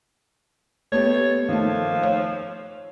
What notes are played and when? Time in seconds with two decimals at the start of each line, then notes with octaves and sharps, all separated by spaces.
0.92 A3 B3 G4 C#5
1.49 D#3 F3 A3
2.03 C#5